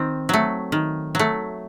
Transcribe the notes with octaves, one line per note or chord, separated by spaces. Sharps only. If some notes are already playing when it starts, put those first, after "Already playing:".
Already playing: D#3 C4
F#3 A3
D#3
F#3 A3